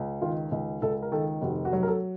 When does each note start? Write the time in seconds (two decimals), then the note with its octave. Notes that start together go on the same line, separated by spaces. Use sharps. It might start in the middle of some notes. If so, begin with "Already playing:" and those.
Already playing: C#2
0.22 D#3 F4
0.52 C#2
0.82 C#2 A4
1.02 A#4
1.12 D#3 A4
1.42 F1 F#4
1.65 F#4
1.73 F#3
1.83 A#4
1.88 A4